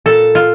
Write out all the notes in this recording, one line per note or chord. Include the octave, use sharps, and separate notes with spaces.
A#2 A4
F4